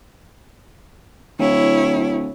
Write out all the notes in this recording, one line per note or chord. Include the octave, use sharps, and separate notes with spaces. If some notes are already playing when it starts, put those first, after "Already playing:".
D1 E4 C#5